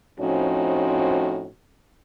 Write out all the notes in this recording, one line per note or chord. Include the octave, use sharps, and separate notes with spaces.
A2 F3 C4 C#4 D#4 F#4